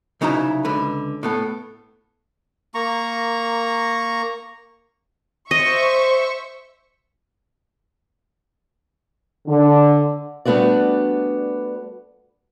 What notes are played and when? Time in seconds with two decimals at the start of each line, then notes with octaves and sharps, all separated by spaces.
0.21 C2 C#3 F#3 D#4 E4 A#5
0.65 C#2 D3 B4
1.23 A2 B3 A4
2.74 A#3 A#5 C#6
5.51 C5 D#5 E5 C#6
9.47 D3
10.45 G3 A3 B3 D4 F#4 D5